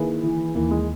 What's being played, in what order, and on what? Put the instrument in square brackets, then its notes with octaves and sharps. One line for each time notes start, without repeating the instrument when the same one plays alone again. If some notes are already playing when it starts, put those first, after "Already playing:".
Already playing: [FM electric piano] D#3 A#3 E4 G#4 B4
[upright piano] E3
[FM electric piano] D#2 D#3 A#3 [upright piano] E3
[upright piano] G#3